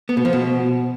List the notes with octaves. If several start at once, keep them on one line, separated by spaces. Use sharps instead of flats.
B3
B2
F3
B2